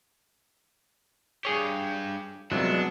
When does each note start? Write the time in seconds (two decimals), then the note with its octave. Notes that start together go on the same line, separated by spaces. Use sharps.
1.45 G2 G4 G#4 C#5
2.52 C2 F2 F#3 G#3 B3 D4